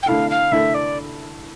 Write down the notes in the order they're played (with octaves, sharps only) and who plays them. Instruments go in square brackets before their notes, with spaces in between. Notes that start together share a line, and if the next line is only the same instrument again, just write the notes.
[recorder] G5
[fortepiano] D3 A3 E4 A4 [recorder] F5
[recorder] F5
[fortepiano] D3 A3 E4 A4 [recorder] E5
[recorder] D5